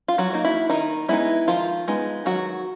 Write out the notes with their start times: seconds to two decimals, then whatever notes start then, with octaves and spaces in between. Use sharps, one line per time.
0.08 F4
0.18 F#3 F#4
0.31 F#3 A#3 D#4
0.45 E4
0.70 D#3 D#4
1.09 G#3 B3 D#4 E4
1.47 D#3 F3 F4
1.88 G#3 B3 D#4
2.26 D#3 F#3 F#4